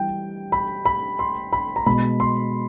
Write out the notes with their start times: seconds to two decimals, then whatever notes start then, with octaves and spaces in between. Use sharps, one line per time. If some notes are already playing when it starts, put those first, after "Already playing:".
Already playing: E3 G3 G5
0.52 B5
0.86 B5
1.19 C6
1.53 B5
1.76 A#5
1.86 B2 G#3 B5
2.20 C6